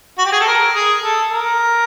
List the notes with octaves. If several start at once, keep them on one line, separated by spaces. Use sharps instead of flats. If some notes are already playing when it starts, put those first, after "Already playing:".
F#4
G4
G#4
A4
A#4
G#4
A4
A#4